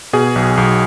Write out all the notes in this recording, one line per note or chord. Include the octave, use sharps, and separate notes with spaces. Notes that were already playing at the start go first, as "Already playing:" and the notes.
B2 G#4
B1
B1